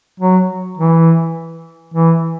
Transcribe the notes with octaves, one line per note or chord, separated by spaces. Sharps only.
F#3
E3
E3